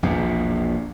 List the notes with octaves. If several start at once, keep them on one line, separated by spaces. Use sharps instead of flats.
A#1 E2 B2